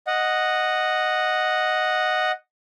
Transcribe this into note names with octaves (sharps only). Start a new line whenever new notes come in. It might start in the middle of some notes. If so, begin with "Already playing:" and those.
D#5 F#5